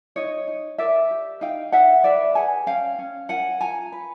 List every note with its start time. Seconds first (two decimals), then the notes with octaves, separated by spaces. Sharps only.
0.16 D#4 C#5 D#5
0.48 D#4
0.78 A#4 D5 E5
1.11 G4
1.41 D#4 F5 G5
1.72 D#4 E5 F#5
2.04 B4 D5 E5
2.35 G#4 F#5 G#5
2.66 C#4 F5 G5
2.99 C#4
3.29 A#4 F#5 G#5
3.61 F4 G#5 A#5
3.92 B4